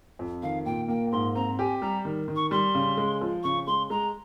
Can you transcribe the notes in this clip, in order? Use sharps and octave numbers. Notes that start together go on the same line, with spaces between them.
F2
D#3 F5
A#2 G5
A#3 G5
G#2 C6
C4 A#5
G4 G#5
G3 A#5
D#3
D#3
C#6
G3 C6
C#3
G#3
F3
C#3 C#6
G#3 C6
G#3 A#5